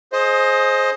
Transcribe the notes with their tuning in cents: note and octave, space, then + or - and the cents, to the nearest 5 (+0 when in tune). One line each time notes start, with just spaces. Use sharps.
G#4 +20 C5 +15 D#5 +0